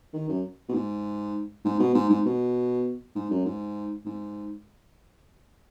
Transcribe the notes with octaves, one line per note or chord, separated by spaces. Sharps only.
D#3
F#2
B2
G#2
G#2
B2
G#2
G#2
B2
G#2
F#2
G#2
G#2